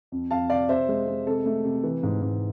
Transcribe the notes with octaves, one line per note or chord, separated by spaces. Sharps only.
F2
F2 F5 A5
C3 D5 F5
C3 C5 E5
G#3
G#3
C3 A4
A3
C3
E3
G#2
G#2